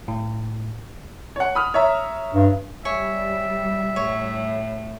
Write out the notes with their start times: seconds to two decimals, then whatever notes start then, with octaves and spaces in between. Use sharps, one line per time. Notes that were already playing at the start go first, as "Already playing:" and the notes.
0.08 A2
1.36 C#5 F#5
1.55 B5 D#6 F6
1.74 C#5 E5 A#5
2.34 G2
2.85 G3 C#5 E5 G#5
3.96 A2 C#5